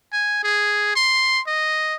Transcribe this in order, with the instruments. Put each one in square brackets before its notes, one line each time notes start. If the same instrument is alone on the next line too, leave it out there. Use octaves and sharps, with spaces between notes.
[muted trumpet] G#5
G#4
C6
D#5